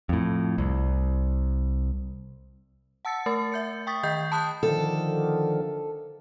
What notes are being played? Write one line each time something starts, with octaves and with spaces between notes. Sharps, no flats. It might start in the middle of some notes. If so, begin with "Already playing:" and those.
F2 A2
C2
F#5 A5 E6 A6 C#7
A3 A#4 A6
E5 G6 C#7
G5 C#6 D#6 A6 B6
D#3 D#5 G5 G6 C7
A5 B5 D#6 F#6 G6
D3 D#3 F3 A4